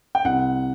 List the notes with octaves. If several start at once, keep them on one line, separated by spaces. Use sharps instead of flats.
G5
C2 F#5